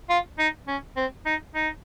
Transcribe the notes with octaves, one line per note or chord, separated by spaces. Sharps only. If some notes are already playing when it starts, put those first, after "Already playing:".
F4
D#4
C#4
C4
D#4
D#4